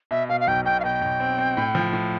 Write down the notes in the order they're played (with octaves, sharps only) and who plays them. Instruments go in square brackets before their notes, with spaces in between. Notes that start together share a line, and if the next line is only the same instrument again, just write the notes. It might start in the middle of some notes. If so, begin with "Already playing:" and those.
[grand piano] B2 [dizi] E5
[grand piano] B2 [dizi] F5
[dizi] F5
[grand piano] B1 [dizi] G5
[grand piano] B2 [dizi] G5
[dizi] F5
[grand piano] B2 [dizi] G5
[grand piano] B1
C4
C4
A2
F3
A2